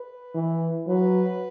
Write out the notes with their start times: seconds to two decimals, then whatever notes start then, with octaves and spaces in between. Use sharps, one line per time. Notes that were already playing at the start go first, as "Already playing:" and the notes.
Already playing: B4
0.35 E3
0.88 F#3 B4